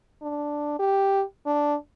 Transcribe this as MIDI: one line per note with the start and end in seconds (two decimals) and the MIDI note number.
0.22 0.78 62
0.79 1.23 67
1.46 1.75 62